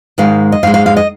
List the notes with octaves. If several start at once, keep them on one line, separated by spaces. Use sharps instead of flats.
G#2 D#3 G#3 F5
D#5
G#2 G#3 F5
F5
F5
D#5